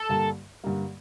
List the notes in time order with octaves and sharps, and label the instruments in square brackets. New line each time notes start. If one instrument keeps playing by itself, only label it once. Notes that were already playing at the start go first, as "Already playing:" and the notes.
Already playing: [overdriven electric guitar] A4
[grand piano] G2 D3 G3 A#3
G2 D3 G3 A#3